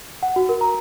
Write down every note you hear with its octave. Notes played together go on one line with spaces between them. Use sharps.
F#5
F#4
A#4
A#5